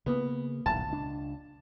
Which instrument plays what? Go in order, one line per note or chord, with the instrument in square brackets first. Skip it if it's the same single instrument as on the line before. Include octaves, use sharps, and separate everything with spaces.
[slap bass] C#3 A#3 [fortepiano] B3
[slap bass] D#1 B1 G#2 [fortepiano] A5
[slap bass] C#2 D4